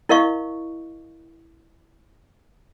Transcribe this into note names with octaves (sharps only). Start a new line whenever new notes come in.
E4 A#4 D#5 F5 C#6